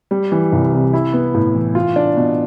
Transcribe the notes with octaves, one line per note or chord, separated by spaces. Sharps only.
G3
E3
C2
C3
E4
B3
A2
E3
F4
D4
B2